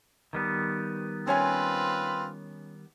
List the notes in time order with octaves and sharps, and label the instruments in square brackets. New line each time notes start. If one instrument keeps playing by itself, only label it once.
[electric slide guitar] D#3 G3 B3
[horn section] C4 F4 B4 [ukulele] C#4 C#5 G#5